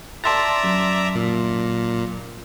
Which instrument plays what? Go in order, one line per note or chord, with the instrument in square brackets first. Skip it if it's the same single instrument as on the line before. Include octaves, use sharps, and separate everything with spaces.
[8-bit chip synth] D5 E5 A#5 [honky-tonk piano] A5 C6 A6
[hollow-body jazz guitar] F#2
[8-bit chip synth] A#2